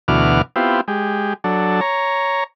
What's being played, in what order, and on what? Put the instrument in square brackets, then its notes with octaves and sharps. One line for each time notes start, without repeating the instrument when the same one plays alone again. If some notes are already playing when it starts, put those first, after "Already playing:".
[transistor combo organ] D2 B2 E3 F#4 D6 F6
B3 C4 E4 F4 G4
G#3 G4
F#3 D4 A4
C#5 A#5